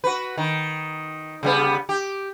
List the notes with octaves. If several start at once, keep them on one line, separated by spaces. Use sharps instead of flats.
F#4 B4
D#3
C#3 G3 B3
G4